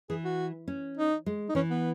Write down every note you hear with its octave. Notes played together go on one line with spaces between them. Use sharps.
E3 G#4
F#4
C#4
D#4
G#3
D#4
E3 C#4
B3